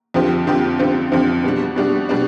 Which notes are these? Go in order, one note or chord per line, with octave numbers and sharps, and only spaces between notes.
F2 D3 F3 C4 G4
F2 D3 F3 C4 G4
F2 D3 F3 C4 G4
F2 D3 F3 C4 G4
B2 G3 D4
B2 G3 D4
B2 G3 D4